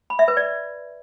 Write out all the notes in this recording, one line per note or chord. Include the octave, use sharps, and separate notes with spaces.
B5
E5
B4
D5